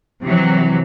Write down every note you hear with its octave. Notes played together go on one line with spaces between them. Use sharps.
C3 E3 F#3